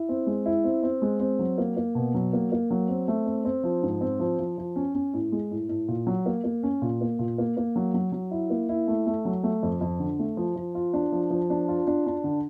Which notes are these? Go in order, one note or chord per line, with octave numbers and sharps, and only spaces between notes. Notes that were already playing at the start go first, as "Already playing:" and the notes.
Already playing: E4
C4
G#3
E4
C4
C4
G#3
C4
F#3
A#3
A#3
B2
F#3
A#3
A#3
F#3
C4
A3
C4
C4
F3
G#2
C4
F3
F3
F3
C#4
C#4
A2
G#3
A2
A2
A#2
F#3
A#3
A#3
C#4
A#2
A#3
A#2
A#3
A#3
F#3
F#3
F#3
E4
A#3
E4
A3
A3
F#3
A3
F2
F2
D3
A3
F3
F3
F4
D4
F3
F3
D4
F4
D4
D4
D3